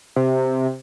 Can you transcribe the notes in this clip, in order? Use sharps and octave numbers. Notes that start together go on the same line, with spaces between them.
C3